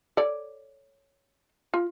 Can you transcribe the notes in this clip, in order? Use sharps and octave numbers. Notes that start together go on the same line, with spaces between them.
A4 C#5 D5
F4